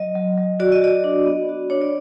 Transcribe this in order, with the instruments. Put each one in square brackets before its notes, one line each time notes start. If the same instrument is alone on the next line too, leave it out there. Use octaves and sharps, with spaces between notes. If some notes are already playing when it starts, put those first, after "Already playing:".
Already playing: [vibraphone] F#3 D#5
F#3
F#3
F#4 D5
D#5
F#4 D5
D4
B3
F#4
D4 C#5
D5